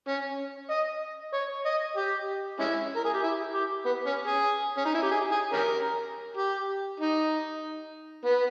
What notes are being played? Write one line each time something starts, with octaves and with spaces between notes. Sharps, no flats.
C#4
D#5
C#5
D#5
G4
G#3 C#4 E4
A#4
G#4
G4
E4
G4
B3
C#4
G#4
C#4
D#4
E4
G4
G#4
G#4
C#4 G4 A#4
G4
D#4
B3